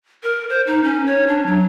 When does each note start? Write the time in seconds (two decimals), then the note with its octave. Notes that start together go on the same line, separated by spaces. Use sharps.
0.23 A#4
0.49 C5
0.67 D#4
0.84 C#4
1.06 C#5
1.27 D4
1.46 F#3